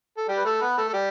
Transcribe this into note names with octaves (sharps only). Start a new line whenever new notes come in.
A4
G3 G4
B4
A3 A4
B3 B4
A3 A4
A4
G3 G4